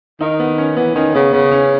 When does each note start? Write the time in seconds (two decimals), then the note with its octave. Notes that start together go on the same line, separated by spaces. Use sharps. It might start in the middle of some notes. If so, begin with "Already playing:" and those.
0.20 D#3 D#4
0.39 B3
0.58 C#4
0.76 E3 B3
0.95 D#3 C#4
1.14 C#3 B3
1.33 C#3 B3
1.52 C#4